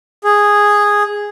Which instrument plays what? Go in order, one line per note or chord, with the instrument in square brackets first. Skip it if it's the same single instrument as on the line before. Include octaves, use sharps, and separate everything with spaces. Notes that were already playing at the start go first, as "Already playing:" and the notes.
[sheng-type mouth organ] G#4